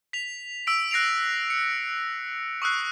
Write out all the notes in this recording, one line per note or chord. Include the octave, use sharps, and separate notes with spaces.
B6 F7
E6 B6 D7
F#6 A#6 C7 D7 F7
C#7
C#6 D#6 E6 F#6 C7